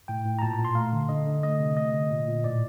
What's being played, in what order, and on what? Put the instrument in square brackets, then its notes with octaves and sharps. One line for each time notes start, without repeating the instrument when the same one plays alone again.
[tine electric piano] A2 G5
A2
A#5
A#2 A5
A#5
A#2
C6
A3 F5
D3
D3 D#5
D3
A3 D#5
C3
A3 D#5
D3
A#2
A#2
A2 D5